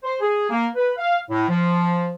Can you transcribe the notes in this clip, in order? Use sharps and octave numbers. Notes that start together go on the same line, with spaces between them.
C5
G#4
A#3
B4
F5
A2
F3